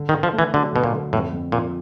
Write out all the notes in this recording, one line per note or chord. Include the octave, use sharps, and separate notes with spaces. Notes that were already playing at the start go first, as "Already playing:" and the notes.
Already playing: D3
D#3
D3
F3
A3
E3
D3 F#3
B2 D3
A#2
D3
F2 A2
F2
A#2 F3